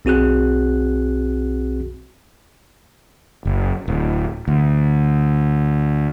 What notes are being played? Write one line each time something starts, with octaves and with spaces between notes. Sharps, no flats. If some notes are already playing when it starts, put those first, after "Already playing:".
B1 C4 F#4 G#4 F#6
F#1
D1
D2